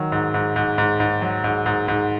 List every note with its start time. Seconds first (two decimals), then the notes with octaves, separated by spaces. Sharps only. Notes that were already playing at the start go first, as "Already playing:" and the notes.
Already playing: D#3 F#3
0.12 G#2
0.34 G#2
0.56 G#2
0.78 G#2
1.00 G#2
1.22 F#3
1.44 G#2
1.66 G#2
1.88 G#2